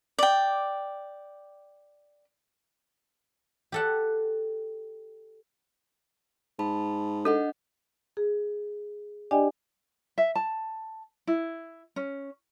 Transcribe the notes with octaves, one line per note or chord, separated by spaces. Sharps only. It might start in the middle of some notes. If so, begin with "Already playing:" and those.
D5 G5
G4 A4 F#5
G#2 A5 B5
D4 A4 D#5 F#5
G#4
D4 G4 D5 D#5 G5 G#5
E5
A5
E4
C#4